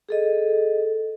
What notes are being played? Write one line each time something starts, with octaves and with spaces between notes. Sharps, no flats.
G#4 A4 D#5